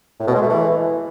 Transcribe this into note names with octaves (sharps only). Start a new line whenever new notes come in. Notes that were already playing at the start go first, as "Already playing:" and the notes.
A2
B2
G#3
A3
E3